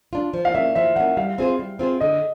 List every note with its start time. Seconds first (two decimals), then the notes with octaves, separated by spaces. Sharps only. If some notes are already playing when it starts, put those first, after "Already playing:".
0.13 D4 F4
0.34 F3
0.45 F5
0.54 A#3 C#4 E5
0.75 F3 E5
0.96 A#3 C#4 F#5
1.17 G3 F5
1.38 C4 F4 G#4 C5
1.59 G3
1.79 C4 F4 G#4 C5
2.00 D3 D#5